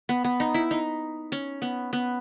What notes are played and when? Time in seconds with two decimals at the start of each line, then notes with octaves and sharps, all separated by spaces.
0.09 B3
0.24 B3
0.40 D#4
0.54 E4
0.71 D#4
1.32 C#4
1.62 B3
1.93 B3